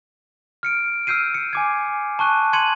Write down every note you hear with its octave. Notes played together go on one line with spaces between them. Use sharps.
F6 C#7 D7
E6 F6 G6 C7 D#7
C#7
G#5 D6 G#6
A5 C#6 F#6 D#7
C6 G#6 C#7 D#7 F#7